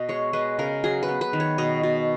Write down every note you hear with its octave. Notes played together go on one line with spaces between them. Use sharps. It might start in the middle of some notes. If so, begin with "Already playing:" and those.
Already playing: B2 D#5
G#3 C#5
G#3 B4
C#3 A#4
F#3 G#4
B4
B3
B4
D#3
C#5
B2 D#5
B2